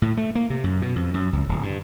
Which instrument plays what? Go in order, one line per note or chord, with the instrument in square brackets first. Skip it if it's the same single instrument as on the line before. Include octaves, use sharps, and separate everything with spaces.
[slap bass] A2
A3
A#3
C3
F#2
B2
F2
F#2
C#2
D1
G2